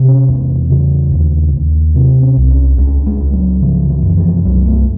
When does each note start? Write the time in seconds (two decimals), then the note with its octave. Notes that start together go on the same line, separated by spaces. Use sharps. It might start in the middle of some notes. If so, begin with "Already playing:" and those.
Already playing: C3
0.08 C#4
0.28 E2
0.70 C#3
1.12 D#2
1.54 D#2
1.95 C3 C4
2.23 C#4
2.37 C2
2.51 C#4
2.78 C#2 D4
3.06 G#3
3.20 C#2
3.34 F#3
3.62 C#3 F3
3.89 E3
4.03 F#2
4.17 F3
4.45 C2 F#3
4.66 A3